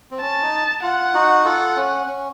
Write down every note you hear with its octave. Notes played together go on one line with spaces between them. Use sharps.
C4
C#4 A5
D#4
F4 F#5
D#4 F#4
F4 A4 F#5
C#4
C#4